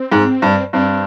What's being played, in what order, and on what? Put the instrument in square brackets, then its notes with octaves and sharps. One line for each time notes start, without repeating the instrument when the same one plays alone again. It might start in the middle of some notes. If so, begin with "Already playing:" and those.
Already playing: [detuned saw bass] C4
[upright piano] G#2
G2
[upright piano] G2 [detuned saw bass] C4